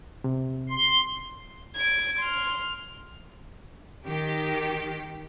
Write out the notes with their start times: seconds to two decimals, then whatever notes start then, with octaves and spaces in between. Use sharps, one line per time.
0.24 C3
0.70 C6
1.76 G#6 D7
2.19 C6 F6
4.05 D#3 G4